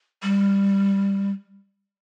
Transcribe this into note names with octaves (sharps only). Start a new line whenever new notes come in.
G3